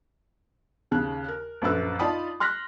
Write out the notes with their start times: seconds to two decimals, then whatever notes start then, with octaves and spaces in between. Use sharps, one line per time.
0.91 D#2 C#3 F#6
1.28 A#4
1.62 A#1 F#2 A4 B4 E6
1.99 D#4 F4 D5 A5 B5 D#6
2.40 C6 F6 F#6 A#6 B6